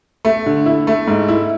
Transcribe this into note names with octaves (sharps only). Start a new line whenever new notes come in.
A3
D3
E4
A3
G#2
E4